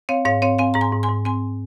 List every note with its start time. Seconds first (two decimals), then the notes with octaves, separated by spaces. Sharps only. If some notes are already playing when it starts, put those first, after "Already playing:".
0.09 C4 C#5 F5
0.25 G#2 C#5 F5
0.42 C4 C#5 F5
0.59 C4 F5 G#5
0.74 G#2 A#5
0.81 G#5 C6
0.92 G#2
1.03 G#5 C6
1.09 G#2
1.25 C4 G#5 C6